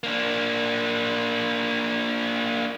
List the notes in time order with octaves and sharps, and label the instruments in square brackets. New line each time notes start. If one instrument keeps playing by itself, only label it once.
[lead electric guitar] A#3 D4